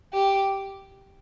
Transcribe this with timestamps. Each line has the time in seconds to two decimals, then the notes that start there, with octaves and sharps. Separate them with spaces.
0.13 G4